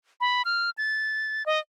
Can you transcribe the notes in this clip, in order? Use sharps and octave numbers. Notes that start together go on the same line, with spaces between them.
B5
F6
A6
D#5